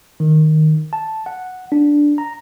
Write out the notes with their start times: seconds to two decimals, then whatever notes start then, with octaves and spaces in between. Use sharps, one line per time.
0.20 D#3
0.93 A5
1.26 F#5
1.72 D4
2.18 A#5